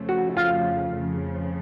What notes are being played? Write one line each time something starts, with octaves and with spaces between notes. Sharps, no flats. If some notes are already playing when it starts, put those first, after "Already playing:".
Already playing: F2 C#3 F3 A3
F#4
F4
F2 C#3 F3